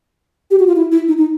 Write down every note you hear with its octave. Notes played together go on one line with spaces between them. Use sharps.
G4
F#4
F4
E4
E4
D#4
D#4